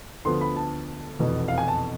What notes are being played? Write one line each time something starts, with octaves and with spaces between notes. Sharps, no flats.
D2 D3 F3 B3 C6
B5
A5
F1 E2 B2 B3
F5
G#5
A5